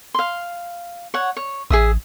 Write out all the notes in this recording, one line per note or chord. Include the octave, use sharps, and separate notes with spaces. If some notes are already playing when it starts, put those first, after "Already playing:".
F5 C6
C#5 F#5
C#5
A1 G#4 E5 D#6